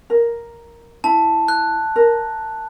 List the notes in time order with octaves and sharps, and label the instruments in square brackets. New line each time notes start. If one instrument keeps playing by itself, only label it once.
[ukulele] A#4
[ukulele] E4 [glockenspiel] A5
[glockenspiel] F#6
[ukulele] A#4